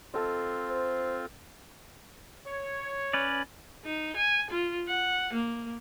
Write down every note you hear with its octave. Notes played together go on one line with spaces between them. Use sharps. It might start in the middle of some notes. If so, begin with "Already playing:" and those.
C4 F4 A4 D#5
C5
C#5
C#4 B4 D5
D#4
G#5
F4
F#5
A#3